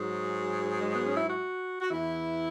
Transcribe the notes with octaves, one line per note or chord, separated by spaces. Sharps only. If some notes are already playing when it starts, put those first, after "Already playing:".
Already playing: G#2 F#3 G#4
G#3
B3
C#4
E4
F#4
F#4
E2 E3 E4